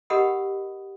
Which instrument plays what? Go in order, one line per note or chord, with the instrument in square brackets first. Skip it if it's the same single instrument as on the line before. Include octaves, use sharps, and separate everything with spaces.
[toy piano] G4 A#4 D#5 F#5 B5 D#6